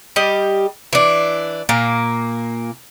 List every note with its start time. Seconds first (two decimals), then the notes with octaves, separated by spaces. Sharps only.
0.16 G3 G4 D#5
0.93 E3 D4
1.69 A#2 A#3